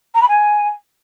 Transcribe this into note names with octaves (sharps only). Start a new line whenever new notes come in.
A#5
B5
G#5